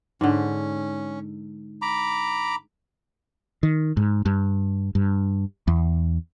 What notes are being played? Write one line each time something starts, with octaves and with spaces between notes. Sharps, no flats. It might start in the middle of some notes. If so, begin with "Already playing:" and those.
G#2 D3 C#4
A#5 B5 D6
D#3
G#2
G2
G2
E2